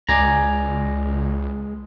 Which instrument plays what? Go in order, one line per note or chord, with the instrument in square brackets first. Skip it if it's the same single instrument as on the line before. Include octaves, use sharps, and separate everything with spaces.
[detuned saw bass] C#2 [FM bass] G#3 [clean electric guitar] D5 G#5 A#5